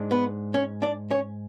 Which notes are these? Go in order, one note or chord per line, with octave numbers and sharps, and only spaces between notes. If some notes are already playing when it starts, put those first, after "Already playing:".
Already playing: G#2 G#3 D4
B3 B4
C#4 C#5
D4 D5
C#4 C#5